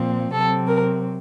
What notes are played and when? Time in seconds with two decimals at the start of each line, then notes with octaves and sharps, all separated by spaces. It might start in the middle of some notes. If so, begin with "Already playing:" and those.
Already playing: A#2 F3 C4
0.32 C3 F#3 C4 A4
0.69 A#4